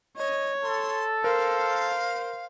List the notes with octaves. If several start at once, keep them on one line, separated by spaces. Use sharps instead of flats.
C#5 D#5
A4 C6
A#4 C5 F5